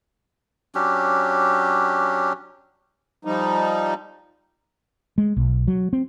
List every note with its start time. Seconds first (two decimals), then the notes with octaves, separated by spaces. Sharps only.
0.75 F#3 C#4 D4 G4
3.25 F3 G3 D#4
5.18 G#3
5.37 B1
5.68 F#3
5.93 C4